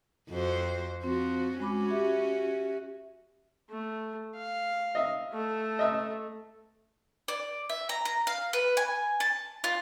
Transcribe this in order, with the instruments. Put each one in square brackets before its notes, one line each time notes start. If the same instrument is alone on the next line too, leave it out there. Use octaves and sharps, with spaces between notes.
[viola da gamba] F2 F#4 C5
[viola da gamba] F3 F#4 [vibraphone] C4
[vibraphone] G#3 B5 D6 [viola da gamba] C#4 F#4
[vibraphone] G4 E5
[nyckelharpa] A3
F5
[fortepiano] D#5 E5
[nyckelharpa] A3 A4
[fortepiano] D#5 E5 E6
[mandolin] D5
E5
A#5
A#5
F5
B4
G#5
A5
F4